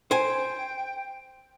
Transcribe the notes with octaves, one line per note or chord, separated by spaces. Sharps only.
C5 G5 G#5